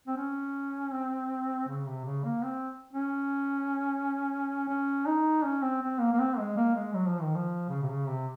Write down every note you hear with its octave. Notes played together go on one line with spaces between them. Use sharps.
C4
C#4
C4
C#3
C3
C#3
A#3
C4
C#4
C#4
D#4
C#4
C4
C4
A#3
A#3
C4
G#3
A#3
G#3
F#3
F3
D#3
F3
C#3
C3
C#3
C3